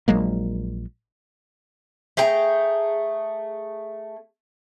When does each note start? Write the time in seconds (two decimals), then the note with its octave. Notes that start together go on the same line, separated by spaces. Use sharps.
0.08 A#1 F#3 G#3 A#3
2.17 A3 G#4 G5 A#5